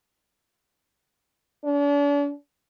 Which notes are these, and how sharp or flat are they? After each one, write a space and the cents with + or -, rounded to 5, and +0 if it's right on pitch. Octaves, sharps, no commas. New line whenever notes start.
D4 -40